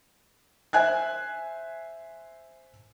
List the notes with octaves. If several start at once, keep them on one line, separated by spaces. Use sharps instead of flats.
C5 E5 G#5 F#6 G#6